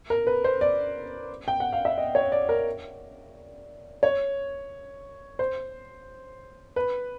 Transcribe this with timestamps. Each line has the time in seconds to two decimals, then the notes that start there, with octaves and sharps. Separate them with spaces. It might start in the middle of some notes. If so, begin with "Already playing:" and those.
0.10 A#4
0.27 B4
0.44 C5
0.61 D5
1.48 G5
1.60 F#5
1.73 F5
1.85 E5
1.98 D#5
2.15 C#5
2.32 D5
2.49 A#4
4.03 C#5
5.39 C5
6.76 B4